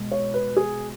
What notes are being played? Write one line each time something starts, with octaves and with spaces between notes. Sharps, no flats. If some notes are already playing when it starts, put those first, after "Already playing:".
Already playing: B2 G#3
C#5
B4
G#4